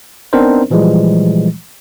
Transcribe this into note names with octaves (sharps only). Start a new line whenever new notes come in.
B3 C4 D4 D#4 A#4 C5
A#2 E3 F3 G3 G#3